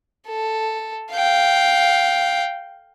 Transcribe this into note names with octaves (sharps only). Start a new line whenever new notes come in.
A4
F5 G5